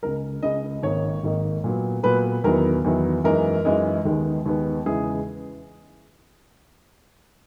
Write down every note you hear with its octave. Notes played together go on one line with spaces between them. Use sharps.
C#2 C#3 G#3 A#4
C#2 C#3 G#3 D#5
G#1 G#2 D#3 A#3 D#4 C#5
G#1 G#2 D#3 A#3 D#4
A#2 F#3 B3
A#2 F#3 B3 B4
E2 D#3 F#3 B3 E4 A#4
E2 D#3 F#3 B3 E4
F#2 E3 G#3 D#4 A#4
F#2 E3 G#3 D#4
D#2 D#3 G#3 B3
D#2 D#3 G#3 B3
E2 C#3 G#3 B3 E4 G#4